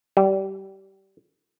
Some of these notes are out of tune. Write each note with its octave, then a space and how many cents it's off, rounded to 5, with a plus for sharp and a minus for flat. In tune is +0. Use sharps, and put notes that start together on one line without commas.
G3 -20